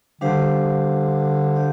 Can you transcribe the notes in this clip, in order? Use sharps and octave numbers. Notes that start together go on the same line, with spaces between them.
D3 G3 D4 G4 C5 F5
G4 D5 F5